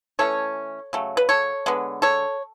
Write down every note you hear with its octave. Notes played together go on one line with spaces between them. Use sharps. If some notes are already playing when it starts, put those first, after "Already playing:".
E3 A3 C#4 A4 C#5
C#3 F#3 A3
B4
A4 C#5
D3 G#3 B3
A4 C#5